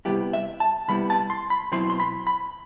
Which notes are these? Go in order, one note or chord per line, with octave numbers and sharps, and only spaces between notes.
C3 G3 B3 E4 G4
E5
A5
C3 G3 B3 E4 B5
A5
C6
B5
B2 F#3 C4 E4 C6
C6
B5
B5